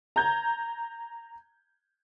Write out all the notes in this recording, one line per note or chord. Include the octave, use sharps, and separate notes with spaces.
A#5 G6 G#6